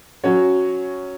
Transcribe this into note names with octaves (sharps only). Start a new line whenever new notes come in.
F#3 C#4 F#4 C#5